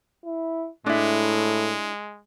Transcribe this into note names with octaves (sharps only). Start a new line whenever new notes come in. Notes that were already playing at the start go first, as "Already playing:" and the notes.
E4
A2 G#3 D4 E4